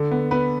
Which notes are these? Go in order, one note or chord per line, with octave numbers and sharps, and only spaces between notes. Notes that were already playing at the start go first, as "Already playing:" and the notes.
Already playing: D3 A4
B3
B3 B4